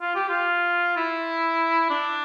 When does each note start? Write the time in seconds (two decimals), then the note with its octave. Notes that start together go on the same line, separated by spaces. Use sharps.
0.01 F4
0.15 G4
0.29 F4
0.97 E4
1.90 D4